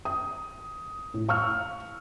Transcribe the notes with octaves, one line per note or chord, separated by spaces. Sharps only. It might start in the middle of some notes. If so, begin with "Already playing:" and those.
D#6
A2
F5 C#6 E6 F6